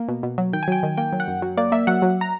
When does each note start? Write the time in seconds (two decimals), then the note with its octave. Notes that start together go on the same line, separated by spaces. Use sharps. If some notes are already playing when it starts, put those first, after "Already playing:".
Already playing: A#3
0.08 B2
0.23 B2
0.38 F#3
0.53 D#3 G5
0.63 G#5
0.68 F#3 G5
0.83 D#3
0.97 A#3 G5
1.13 F#3
1.20 F#5
1.28 F#2
1.42 F#3
1.57 A#3 D5
1.72 A#3 E5
1.87 F#3 F#5
2.02 F#3
2.21 A#5